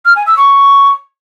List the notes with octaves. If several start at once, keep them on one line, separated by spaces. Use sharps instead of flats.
F6
G#5
E6
C#6